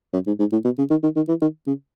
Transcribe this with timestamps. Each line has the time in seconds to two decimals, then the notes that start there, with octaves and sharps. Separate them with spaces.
0.13 F#2
0.27 G#2
0.39 G#2
0.52 A2
0.64 B2
0.78 C#3
0.90 D#3
1.03 D#3
1.16 D#3
1.28 E3
1.41 D#3
1.67 C#3